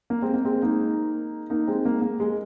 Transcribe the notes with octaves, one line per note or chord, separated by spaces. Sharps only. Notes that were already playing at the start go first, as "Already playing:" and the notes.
A#3
G#3 C4
A#3
G#3 C4
A#3 D#4
A#3 D#4
G#3 C4
A#3
A#3
G#3